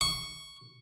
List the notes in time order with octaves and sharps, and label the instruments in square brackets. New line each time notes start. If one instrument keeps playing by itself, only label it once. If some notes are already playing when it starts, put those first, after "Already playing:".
[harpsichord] C#6